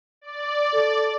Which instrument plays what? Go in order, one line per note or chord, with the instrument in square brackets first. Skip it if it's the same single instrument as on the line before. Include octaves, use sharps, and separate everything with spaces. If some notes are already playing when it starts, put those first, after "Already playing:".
[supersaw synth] D5
[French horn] A4